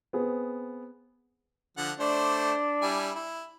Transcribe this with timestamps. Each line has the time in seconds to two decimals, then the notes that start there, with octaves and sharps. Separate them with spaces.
0.13 B3 C4 G#4
1.77 D3 F3 F#5
2.00 A3 D4 C5 D5
2.82 G3 E4 G#5
3.15 E4